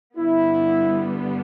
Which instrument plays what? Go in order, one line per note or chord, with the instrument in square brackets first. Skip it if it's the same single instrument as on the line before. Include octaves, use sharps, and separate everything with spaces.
[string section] G2 D3 G3 B3 [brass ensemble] E4